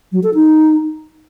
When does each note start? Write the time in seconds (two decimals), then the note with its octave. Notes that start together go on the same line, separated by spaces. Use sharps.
0.12 F#3
0.23 A4
0.35 D#4